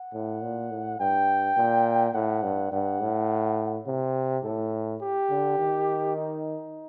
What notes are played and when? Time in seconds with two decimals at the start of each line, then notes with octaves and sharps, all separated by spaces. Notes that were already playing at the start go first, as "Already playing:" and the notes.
Already playing: F#5
0.13 A2
0.42 A#2
0.71 A2
1.00 G2 G5
1.57 A#2
2.14 A2 F#5
2.43 G2
2.72 G2 F#5
3.00 A2
3.87 C3
4.44 A2 A4
5.02 G4
5.30 D3
5.59 D#3
6.16 D#4